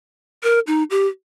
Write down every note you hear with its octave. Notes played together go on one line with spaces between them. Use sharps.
A#4
D#4
G4